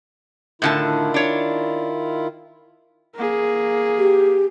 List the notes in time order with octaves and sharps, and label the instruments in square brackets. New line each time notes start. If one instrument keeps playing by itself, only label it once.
[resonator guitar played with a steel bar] A2 D3 A5 [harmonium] D#3 E4 F4
[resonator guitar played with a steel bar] D4 C#5
[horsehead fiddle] A#3 G#4
[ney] G4